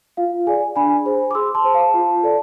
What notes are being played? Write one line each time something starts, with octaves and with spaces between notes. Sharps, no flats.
F4 F5
G#4 D5 G#5
D4 G#5 B5
G#4 C5
D6
G#4 C6 E6
A5 C6
C5
F5 A5
F4
A4 D5